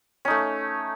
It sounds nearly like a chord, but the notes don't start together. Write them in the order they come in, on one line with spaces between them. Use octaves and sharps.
C#4 D#4 A3